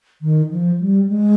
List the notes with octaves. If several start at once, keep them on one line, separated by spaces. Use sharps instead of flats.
D#3
F3
G3
G#3